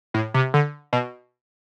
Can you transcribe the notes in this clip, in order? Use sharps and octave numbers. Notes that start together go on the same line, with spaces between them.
A2
C3
D3
B2